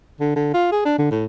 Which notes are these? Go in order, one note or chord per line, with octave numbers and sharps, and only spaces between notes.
D3
D3
F4
G#4
D4
D3
A2